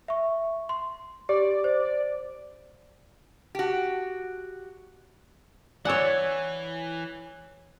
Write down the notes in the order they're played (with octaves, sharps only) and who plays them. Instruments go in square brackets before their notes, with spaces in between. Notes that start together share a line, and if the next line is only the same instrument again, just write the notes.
[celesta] E5 C#6
C6
[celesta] G4 [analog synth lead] D5
[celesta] C5
[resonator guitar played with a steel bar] F#4 G4
[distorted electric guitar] E3 [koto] C#5 F#5 [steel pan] D5 G#5 E6